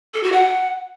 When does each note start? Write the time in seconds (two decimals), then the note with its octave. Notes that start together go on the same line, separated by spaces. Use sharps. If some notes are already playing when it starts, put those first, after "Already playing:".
0.14 A4
0.23 F#4
0.32 F#5